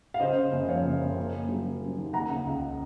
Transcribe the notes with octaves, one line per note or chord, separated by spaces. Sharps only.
F5
C#3 C5 D#5
C#3
F#1
F2 C#5 F5
F#1
F#1
A#3
A#3
F#3
C#3
F#3
D#2
A#3 F#5 A#5
C#3
C#2